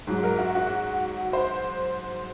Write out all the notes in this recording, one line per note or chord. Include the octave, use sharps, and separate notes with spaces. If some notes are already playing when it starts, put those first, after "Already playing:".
G#2 F#3
A#4
F#4
F#4
C5